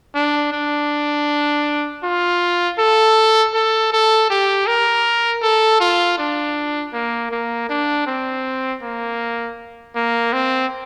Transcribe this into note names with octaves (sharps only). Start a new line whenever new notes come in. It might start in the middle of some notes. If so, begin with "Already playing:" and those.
D4
D4
F4
A4
A4
A4
G4
A#4
A4
F4
D4
A#3
A#3
D4
C4
A#3
A#3
C4